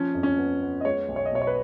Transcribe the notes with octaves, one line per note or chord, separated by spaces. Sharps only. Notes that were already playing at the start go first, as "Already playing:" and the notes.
Already playing: F3 C#4
F2
C#4
B3
B3
D#5
G#3 C#5
B1
C#5
D#5
B2 C#5
C#5
B4